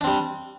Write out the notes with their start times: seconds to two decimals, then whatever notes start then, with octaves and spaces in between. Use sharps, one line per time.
0.01 D4
0.04 C4
0.07 G3